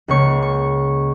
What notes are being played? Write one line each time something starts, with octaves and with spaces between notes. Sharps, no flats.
C#2 C#3 A#3 C#6
C#6